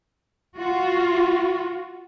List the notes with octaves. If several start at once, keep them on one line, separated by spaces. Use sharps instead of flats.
F4 F#4